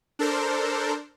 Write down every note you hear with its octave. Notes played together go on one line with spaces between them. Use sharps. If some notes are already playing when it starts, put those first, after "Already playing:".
D4 A4 A#4 C5